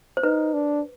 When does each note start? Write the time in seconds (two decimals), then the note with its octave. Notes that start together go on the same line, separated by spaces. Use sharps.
0.17 C5
0.23 D#4 B4
0.54 D4